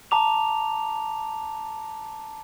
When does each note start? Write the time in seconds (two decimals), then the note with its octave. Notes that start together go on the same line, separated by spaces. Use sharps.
0.11 A5 A#5 D6 F7